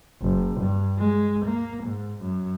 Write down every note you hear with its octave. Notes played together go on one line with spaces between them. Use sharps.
F#1
G2
G#3
A#3
G#2
F#2